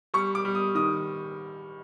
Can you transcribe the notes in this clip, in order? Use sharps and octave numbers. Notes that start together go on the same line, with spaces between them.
G3 C#6
D6
G3
D#6
D#3 D#6